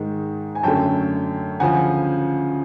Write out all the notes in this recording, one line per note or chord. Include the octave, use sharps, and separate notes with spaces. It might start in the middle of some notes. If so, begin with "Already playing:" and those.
Already playing: G#2 D#3 G#3
G#5
F#2 D3 F#3 A3 G5 A5
D2 C#3 F3 F#5 G#5